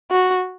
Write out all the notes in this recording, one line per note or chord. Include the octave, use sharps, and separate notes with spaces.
F#4